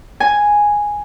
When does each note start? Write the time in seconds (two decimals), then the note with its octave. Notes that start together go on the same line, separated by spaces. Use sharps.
0.20 G#5